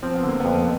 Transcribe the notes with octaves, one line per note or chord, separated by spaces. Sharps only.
F3 C4
B3
D3 A#3
F2 B3